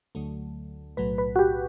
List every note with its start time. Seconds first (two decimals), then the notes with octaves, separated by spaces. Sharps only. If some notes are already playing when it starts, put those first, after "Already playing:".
0.15 D2 D3 F#3 A3
0.97 B1 A2 F#3 A3 B4
1.18 B4
1.36 F#4
1.39 G4